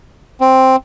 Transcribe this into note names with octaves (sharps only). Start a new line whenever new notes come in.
C4